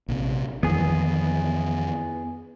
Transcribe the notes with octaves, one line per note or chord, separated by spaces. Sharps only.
A#1 C3
F2 D#3 E3 B3 G#4